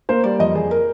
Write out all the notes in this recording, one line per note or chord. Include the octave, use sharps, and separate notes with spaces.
A#3 C5
G3 D5
F2 D#5
F2 G#4
A#4